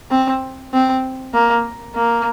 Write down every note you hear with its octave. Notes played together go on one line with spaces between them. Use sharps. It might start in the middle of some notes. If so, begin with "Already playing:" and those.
C4
C4
A#3
A#3